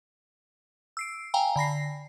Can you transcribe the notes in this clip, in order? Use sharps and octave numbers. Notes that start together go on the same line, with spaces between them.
E6 C7 D7
F5 G5 G#5 A#5
D3 B5 A#6 C7